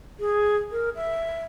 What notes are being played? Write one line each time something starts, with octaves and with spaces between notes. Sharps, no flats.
G#4
A#4
E5